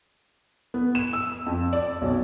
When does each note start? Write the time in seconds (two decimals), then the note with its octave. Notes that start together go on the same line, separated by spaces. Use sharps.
0.74 B3
0.95 E7
1.13 E6
1.46 F2
1.73 D5
2.02 B1